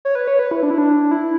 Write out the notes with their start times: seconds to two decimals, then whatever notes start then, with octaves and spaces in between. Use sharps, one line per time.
0.05 C#5
0.15 B4
0.27 C#5
0.39 B4
0.51 E4
0.63 D4
0.71 E4
0.78 D4
1.11 E4